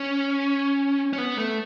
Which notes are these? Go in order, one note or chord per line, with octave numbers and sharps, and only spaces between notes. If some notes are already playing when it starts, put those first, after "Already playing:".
Already playing: C#4
C#4
B3
A3